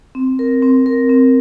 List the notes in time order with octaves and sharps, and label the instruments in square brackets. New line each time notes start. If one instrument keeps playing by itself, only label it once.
[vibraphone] C4
A#4
C4
A#4
C4